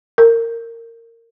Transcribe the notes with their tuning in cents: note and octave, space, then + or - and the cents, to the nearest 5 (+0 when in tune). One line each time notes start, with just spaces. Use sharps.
A#4 -20